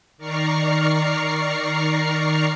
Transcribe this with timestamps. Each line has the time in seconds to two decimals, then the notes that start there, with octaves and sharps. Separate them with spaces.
0.18 D#3 D5 A#5 C#6 F6 C7